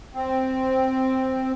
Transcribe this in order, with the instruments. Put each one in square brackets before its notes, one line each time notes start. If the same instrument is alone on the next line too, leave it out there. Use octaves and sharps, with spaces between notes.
[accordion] C4